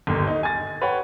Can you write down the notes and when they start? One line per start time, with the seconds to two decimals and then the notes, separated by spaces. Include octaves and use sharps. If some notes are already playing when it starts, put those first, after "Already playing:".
0.07 G1 D#2
0.28 D#4
0.43 G#5 A6
0.82 B4 C#5 F#5 G5